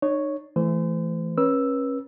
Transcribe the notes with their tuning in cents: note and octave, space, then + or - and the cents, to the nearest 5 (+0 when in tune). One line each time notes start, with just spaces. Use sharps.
D#4 -40 C#5 +0
E3 +15 A3 +0 C5 -35
C#4 -25 B4 -35 E6 +0